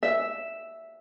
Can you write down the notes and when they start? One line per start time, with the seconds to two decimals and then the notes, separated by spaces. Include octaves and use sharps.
0.03 E5